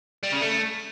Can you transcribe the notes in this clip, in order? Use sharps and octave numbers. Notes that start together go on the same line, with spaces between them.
G3
C#3
A3